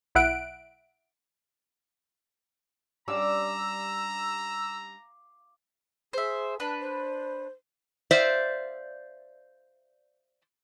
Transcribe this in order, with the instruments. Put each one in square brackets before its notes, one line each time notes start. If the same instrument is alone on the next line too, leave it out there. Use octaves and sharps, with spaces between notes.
[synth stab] B1 E4 E5 F#5 F#6 D7
[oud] G3 C#4 D4 [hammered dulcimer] F5 D6 [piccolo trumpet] A#5 [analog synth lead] E6
[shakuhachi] G#4 [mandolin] C5 E5
[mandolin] D4 B4 [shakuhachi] A5
[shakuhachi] C5
[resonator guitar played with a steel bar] C5 D5 E5 F5